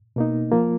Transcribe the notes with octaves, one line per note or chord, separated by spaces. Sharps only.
B2 A#3 D#4
F3 A#3 F4